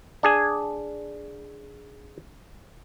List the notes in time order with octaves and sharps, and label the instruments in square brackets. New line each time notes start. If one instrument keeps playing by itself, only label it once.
[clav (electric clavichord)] D4 G#4 G#5